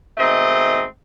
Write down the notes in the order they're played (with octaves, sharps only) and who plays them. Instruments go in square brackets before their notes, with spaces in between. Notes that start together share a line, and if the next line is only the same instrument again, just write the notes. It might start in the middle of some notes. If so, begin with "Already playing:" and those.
[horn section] G#2 B2 D#3 A3 C4 D#5